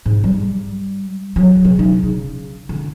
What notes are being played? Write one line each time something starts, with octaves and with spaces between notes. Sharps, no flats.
G#2
G3
F#3
C#3
D#4
C#3
D3